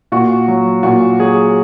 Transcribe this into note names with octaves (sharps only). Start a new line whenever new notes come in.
A#2 F#4
F#3
A#2 F#4
F#3 G#4